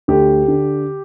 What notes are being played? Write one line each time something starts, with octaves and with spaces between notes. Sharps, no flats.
D2 G4
D3